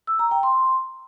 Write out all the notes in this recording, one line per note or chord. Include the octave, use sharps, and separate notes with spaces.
E6
A#5
G5
C6